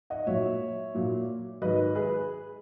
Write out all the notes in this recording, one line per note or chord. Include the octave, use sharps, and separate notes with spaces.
D#5 F#5
A#2 F#3 C#5 E5
A#2 F#3
G#2 D#3 F#3 B4 D#5
G#4 B4